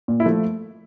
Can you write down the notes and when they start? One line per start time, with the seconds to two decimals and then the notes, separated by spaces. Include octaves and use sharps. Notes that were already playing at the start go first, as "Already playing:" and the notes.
0.08 A#2
0.20 E4
0.26 F3 A3